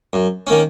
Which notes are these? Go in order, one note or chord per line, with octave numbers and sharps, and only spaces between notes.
F#2
D#3 A#3 C#4